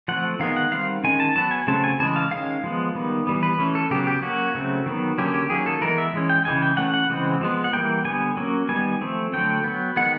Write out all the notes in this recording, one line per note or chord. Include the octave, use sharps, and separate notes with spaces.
F3 A3 C4 F#5
D#3 G#3 B3 F5
F#5
D#3 G3 C4 F5
D#3 G#3 C#4 G#5
A5
F#3 B3 A5
G#5
C#3 F#3 A3 C4 A5
G#5
C#3 E3 G#3 A5
F5
D#3 G#3 C#4 F5
F3 G#3 B3
D#3 G3 B3
E3 G3 B3
B4
E3 A3 C#4
A4
C#3 F#3 B3 G4
G4
F#3 A#3 C#4 F#4
C#3 F#3 A3 C4
D#3 F#3 B3
D3 F#3 A#3 C#4 G4
G4
D#3 F#3 A#3 C#4 G#4
A4
E3 G#3 B3 A#4
E5
E3 G#3 C#4
G5
C#3 E3 G#3 G#5
G5
E3 A3 C#4 F#5
F#5
C#3 E3 G#3 C4
F3 G#3 B3
F#5
E3 G3 A#3 G5
D3 G3 B3 G#5
F#3 A#3 C#4
D#3 G3 B3 G#5
F3 A3 C4
D3 F#3 A3 G5
F#3 B3
D#3 G#3 B3 F#5